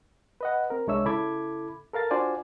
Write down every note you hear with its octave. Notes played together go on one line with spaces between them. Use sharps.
B4 D#5 F#5
C4 A#4
C2 G#3 D4 C#5 E5 E6
C#3 E4 A4 B5 D6 G#6
A4 A#4 F5 A6
D4 F4 F#4 C5 D5 G#5